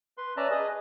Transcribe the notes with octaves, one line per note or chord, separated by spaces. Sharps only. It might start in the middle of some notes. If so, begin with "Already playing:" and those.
B4 C6
C#4 B4 D5 E5 A5 A#5
G#4 B4 D#5